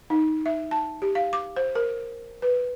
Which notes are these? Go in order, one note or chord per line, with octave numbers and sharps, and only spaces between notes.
D#4
E5
A5
G4
F5
D6
C5
A#4
B4